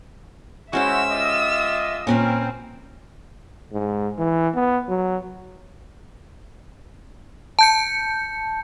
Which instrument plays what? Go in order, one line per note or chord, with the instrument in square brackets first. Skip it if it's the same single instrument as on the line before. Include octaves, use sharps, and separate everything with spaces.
[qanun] G#3 C#4 C5 [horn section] E4 F#4 [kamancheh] E5 E6
[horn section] F4 G4 D#5
[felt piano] A#2 [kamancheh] C4 [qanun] C#4 A#4 B4
[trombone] G#2
E3
B3
F#3
[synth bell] A5 G6 C#7